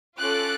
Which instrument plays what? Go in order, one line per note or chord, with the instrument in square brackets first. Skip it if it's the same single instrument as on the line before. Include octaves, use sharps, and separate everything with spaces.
[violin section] C#4 F4 A4 D6 F#6